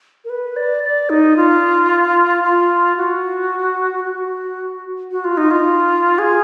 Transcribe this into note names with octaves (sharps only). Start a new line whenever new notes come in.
A#4
B4
D5
D5
D#4
F4
F4
F#4
F#4
F#4
F4
D#4
F4
G#4